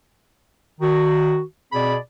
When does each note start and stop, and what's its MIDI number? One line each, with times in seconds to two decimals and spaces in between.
0.81 1.41 51
0.81 1.41 66
1.73 1.96 47
1.73 1.96 60
1.73 1.96 68
1.73 1.96 74
1.73 1.96 83